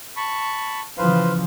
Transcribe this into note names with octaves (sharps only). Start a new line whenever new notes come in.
A5 B5 C#6
C#3 E3 F3 B4 C5 F5